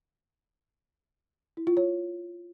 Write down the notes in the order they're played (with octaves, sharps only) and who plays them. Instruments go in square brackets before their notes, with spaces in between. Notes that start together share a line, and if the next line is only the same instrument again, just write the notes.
[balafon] E4
F4
C#5